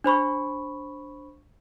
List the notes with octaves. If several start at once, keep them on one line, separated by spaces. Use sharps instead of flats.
D4 C5 B5 C#6